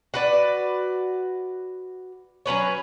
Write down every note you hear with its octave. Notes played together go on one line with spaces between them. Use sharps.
F#4 B4 D5
F#3 C#4 B4 C#5